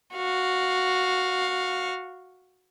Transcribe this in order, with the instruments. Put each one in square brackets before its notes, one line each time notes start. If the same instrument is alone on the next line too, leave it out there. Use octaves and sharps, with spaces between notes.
[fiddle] F#4 F5